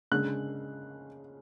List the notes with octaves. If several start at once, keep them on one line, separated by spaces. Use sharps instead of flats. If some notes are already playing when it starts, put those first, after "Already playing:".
C#3 G#3 D4 F#6